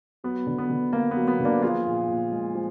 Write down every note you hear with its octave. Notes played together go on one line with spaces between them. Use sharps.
F#3 B3
D3
B3
D3
A#3
B3
F#3
B3
D3
A#3 D4
F3 F4 G#4
A#2
A#2
G#3
F3